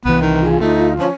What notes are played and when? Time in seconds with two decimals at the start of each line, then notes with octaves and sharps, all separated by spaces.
0.05 C2 E3 B3 B4
0.22 D#3
0.42 F4 G#4
0.61 D2 A3 D#4
0.99 F3 C#4